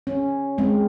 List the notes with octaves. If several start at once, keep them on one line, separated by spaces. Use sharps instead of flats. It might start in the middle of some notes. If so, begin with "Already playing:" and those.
C#4
G#3 C4